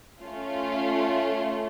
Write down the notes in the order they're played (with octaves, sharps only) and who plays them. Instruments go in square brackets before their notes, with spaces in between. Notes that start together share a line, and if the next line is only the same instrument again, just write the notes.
[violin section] A3 C#4 F4